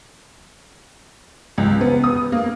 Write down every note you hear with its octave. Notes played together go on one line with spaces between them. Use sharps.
C#2
B3
D#6
A#3